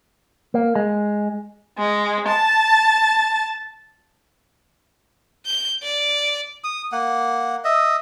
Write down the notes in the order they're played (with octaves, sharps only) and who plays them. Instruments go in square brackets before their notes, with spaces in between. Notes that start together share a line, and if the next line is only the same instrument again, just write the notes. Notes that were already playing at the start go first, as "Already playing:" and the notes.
[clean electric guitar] A#3
G#3
[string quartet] G#3
A5
[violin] G6
D5
[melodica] D#6
A#3 F#5
D#5 E5